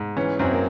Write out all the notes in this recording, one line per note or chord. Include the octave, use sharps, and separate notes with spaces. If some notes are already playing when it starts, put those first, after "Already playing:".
Already playing: G#2
E3 C#4
F#2 C4
A#3